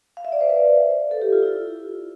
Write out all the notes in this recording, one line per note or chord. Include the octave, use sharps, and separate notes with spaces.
F5
E5
D5
C5
B4
A4
G4
F4
E4